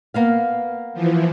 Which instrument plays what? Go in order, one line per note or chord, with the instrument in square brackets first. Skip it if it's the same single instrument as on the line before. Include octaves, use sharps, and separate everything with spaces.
[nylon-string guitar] A#3 B3 F5
[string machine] E3 F3